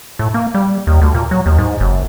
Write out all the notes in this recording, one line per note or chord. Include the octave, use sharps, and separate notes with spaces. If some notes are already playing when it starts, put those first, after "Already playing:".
A2
A#3
G3
D#2
D2
A#2
F#3
D#2
G#2
F#1